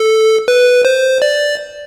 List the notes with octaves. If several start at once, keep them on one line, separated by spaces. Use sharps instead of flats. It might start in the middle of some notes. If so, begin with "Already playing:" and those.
Already playing: A4
B4
C5
D5